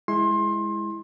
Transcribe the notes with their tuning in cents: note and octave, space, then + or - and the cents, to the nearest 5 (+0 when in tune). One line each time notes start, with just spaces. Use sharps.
G#3 +0 E4 +0 C6 +25